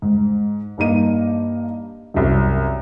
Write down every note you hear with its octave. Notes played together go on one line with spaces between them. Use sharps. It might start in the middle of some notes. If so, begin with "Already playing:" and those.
G#2
G2 A#3 D#4 D#7
C2 F#2